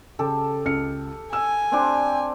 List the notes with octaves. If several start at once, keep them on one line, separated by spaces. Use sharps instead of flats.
C#3 G4 A4
C#2 F6 C#7
G#5 E6
C4 D4 G4